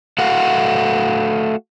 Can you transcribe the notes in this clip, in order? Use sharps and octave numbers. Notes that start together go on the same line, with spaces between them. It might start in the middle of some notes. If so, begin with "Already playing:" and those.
A3 F#4 A4 F5 F#5